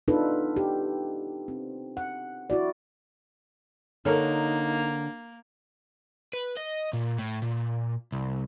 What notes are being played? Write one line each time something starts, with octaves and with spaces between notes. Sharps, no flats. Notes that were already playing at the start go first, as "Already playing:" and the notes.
B3 D4 D#4 F4 A4 B4
G4
C4
F#5
E4 F#4 D5
D3 A#3 D#4 A4 A#4 C#5
B4
D#5
A#2
A2
A#2
C2